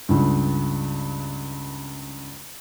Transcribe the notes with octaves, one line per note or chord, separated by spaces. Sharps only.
C#2 G2